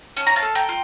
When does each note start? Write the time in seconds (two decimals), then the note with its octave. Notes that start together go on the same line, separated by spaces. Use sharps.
0.17 C#4 A5
0.27 A#5
0.36 F5 A5
0.42 A4
0.55 G5 A#5
0.69 F4